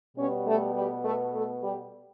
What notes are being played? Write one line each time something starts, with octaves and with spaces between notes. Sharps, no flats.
B2 G3 B3 C#4 C#5
A3 A4
G3 G4
A3 A4
A3 A4
G3 G4